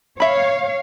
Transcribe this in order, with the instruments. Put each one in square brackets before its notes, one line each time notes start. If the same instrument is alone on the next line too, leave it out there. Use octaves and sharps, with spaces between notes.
[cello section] C#5 F5 [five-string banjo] E5 B5